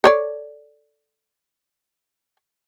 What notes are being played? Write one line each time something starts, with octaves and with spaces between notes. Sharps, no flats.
A4 C#5 D5